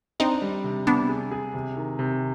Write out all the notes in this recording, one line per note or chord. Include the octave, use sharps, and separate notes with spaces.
C4 D4 D#4
G3
C3
C3 B3 D4
G#4
G#4
C3
D#3
C3